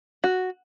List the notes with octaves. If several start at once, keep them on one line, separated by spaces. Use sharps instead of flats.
F#4